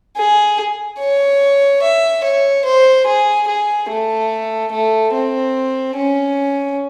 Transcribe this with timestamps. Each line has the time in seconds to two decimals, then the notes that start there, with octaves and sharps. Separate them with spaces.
0.17 G#4
0.99 C#5
1.82 E5
2.24 C#5
2.65 C5
3.07 G#4
3.47 G#4
3.89 A3
4.72 A3
5.13 C4
5.96 C#4